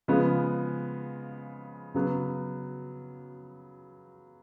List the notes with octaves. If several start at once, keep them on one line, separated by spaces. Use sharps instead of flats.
C#3 F3 G#3 B3
C#3 F#3 B3